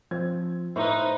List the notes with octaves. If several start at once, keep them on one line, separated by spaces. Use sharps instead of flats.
F3 C4 G#6
A2 D#4 B4 C5